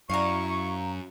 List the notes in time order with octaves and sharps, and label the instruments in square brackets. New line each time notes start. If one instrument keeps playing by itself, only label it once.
[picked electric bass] F#2 [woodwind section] E4 C#6 [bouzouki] F5 A#5